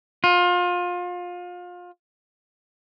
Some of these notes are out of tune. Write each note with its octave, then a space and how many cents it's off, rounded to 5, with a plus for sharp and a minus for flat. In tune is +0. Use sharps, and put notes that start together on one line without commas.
F4 +30